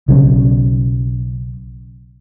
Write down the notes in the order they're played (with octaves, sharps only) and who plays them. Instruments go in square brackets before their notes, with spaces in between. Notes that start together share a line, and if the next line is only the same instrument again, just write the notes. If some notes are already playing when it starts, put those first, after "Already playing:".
[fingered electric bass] B1 C#3 F#3 C#4